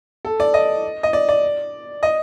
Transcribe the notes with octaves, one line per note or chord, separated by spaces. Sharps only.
A4
D5
D#5
D#5
D5
D5
D#5